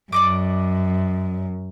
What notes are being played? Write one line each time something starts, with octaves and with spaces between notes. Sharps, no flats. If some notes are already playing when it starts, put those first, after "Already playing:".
F#2 D5 D#5 D6